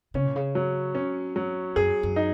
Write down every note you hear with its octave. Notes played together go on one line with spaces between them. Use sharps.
C#3 C#4
A#2
C#3
F#3
C#4
F#3
F#2 G#4
F#2
D#4